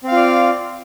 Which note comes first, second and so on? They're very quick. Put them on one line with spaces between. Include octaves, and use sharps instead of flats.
C4 F5 F4 D5